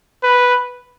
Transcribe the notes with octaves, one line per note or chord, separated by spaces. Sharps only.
B4